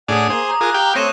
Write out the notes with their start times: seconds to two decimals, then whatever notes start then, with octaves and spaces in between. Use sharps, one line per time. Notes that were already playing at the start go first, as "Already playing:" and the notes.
0.08 A2 D4 G#4 F#5 D6 D#6
0.30 A#3 G#4 C5
0.47 A#5
0.61 F4 G#4 A#4 D#6 F#6
0.74 G4 F5 G5
0.96 A3 C4 C#5 A#6 D#7 E7